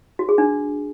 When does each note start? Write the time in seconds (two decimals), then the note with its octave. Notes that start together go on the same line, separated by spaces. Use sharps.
0.19 F#4
0.29 G#4
0.38 D4